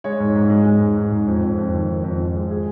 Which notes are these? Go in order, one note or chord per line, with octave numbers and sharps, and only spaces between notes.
G#3 C#5
G#2
G#2
G#3
G#3
G#2
G#2
G#2
F2
F2
F2
D#3
D#3
F2
F2
G#3
G#4